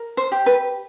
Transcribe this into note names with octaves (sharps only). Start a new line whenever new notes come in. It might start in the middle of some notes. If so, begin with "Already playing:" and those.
Already playing: A#4
C5
G4
B4